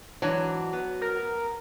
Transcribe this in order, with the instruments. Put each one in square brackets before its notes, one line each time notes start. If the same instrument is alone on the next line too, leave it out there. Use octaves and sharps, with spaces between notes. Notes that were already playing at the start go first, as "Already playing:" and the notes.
[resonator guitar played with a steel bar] G#2 E3 D4 [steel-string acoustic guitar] F#3
[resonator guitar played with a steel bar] B3
[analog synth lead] A#4